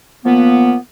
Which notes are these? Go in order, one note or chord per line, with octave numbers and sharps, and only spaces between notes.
A#2 F3 A#3 B3